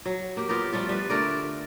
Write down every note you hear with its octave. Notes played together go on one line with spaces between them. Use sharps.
F#3
A#3 G4
B3 F4 G4 A#4
F3 G3 A3 F4
G3 B4
D3 A3 A#4 D5